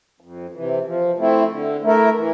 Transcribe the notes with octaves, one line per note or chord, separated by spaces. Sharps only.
F2
C3 E3
F3
A3 C4 E4
D3
A3 E4 A#4
E3